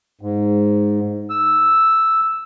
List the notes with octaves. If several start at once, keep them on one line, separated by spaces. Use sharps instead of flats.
G#2
E6